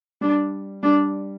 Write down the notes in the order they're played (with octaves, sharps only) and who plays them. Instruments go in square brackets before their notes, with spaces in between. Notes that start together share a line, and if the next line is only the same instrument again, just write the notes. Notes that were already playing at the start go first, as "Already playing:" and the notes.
[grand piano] G3 [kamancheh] D4
[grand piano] G3 [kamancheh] D4